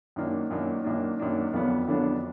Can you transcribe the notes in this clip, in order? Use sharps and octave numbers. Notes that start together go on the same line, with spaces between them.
F#2 D#3 A#3 D4
F#2 D#3 A#3 D4
F#2 D#3 A#3 D4
F#2 D#3 A#3 D4
F2 D3 F#3 B3 D4
F2 D3 F#3 B3 D4